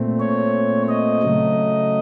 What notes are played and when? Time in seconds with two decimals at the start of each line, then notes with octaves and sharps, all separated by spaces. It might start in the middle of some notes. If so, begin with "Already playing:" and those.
Already playing: A#2 A3 C4
0.20 C#5
0.88 D#5
1.23 C#3 F#3 A3